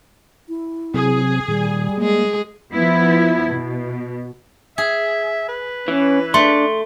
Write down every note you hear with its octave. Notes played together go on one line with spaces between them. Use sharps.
E4
C3 F#3 C4 G#4
A#2 D#3 G3
G#3 A#3 G#4
F3 B3 E4
B2
G#4 E5
B4
E3 C#4
A3 D4 C6